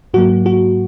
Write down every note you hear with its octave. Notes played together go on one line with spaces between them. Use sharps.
G#2 F#3 A#3 F#4
F#4